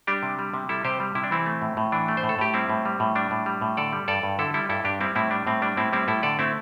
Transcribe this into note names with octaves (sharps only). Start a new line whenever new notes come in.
G3 D4 G4
C3
G3
C3
G3 E4 A4
C3 G4 C5
G3
C3 E4
D4
E3 C4 E4
A3
A2
A2
E3 D4
A3
C5
A2
A4
A2 G4
G3 C4 E4
A2
G3
A2
G3 D4
A2
G3
A2
D3 A4 D5
G3
G2 A4 D5
G2
D3 E4 A4
G3 E4 A4
G2 E4 A4
G2 D4 G4
G3 C4 E4
A2 C4 E4
G3 D4
A2 C4
G3 D4
A2 C4 E4
G3 C4 E4
A2 E4 A4
D3 A4 D5
A3 C4 E4